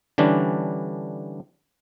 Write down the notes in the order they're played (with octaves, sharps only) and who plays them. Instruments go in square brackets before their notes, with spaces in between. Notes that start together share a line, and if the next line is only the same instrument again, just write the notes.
[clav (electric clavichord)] D3 E3 G3 C#4 D4